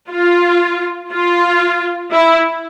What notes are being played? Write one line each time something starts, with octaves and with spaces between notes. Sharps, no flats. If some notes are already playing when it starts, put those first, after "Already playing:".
F4
F4
E4